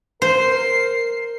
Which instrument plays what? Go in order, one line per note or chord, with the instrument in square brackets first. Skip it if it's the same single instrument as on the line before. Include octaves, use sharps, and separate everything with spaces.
[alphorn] A#4 [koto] C5 [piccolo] C7